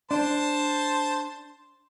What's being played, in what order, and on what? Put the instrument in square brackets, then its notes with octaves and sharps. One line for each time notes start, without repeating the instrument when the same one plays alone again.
[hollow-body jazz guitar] D4 [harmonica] C5 A5 C6